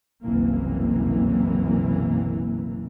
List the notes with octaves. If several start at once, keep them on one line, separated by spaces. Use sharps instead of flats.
F#1 C2 B2 E3 A#3